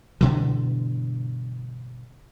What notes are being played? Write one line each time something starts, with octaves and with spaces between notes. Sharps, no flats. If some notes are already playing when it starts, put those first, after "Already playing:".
G2 B2 D3 E3